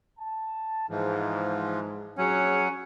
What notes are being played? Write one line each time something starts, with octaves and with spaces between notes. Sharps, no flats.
A5
G#2 E3 F3
A#1 F#3 C#4 G#4 F#5